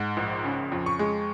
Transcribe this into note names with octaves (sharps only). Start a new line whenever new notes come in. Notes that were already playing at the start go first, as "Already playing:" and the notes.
Already playing: G#2 F#5
A#1
C#3
F2
C#6
G#3